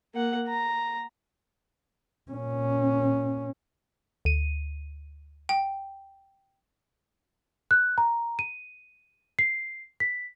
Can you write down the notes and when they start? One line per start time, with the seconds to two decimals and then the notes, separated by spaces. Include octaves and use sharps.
0.14 A#3 F#5
0.48 A#5
2.31 A#2 C#4
4.25 D2 D#7
5.49 G5
7.71 F#6
7.98 A#5
8.39 D#7
9.39 C7
10.00 B6